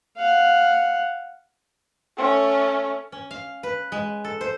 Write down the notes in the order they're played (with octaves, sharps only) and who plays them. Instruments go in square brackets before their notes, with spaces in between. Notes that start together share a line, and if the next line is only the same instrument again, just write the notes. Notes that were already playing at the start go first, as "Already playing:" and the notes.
[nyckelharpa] F5 F#5
[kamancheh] A3 C#4
[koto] C#4
F5
B4
G#3
A4
C5